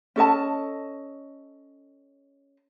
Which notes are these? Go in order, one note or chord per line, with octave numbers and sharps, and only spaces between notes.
C#4 A4 D#5 A5